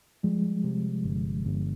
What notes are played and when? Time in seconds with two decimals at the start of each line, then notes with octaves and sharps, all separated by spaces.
0.23 F3 G3 G#3
0.64 C3
1.04 G1
1.46 G1